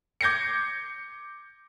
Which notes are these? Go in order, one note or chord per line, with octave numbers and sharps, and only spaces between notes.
D6 G6 G#6 A#6 C7 C#7